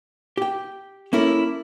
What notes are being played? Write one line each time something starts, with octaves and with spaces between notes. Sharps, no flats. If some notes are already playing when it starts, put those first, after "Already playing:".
G4 G5
A#3 C#4 E4 A4 A#4